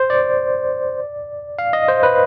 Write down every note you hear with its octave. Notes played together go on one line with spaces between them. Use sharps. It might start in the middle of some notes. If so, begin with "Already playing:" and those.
Already playing: C5
D5
F5
D#5
C5
B4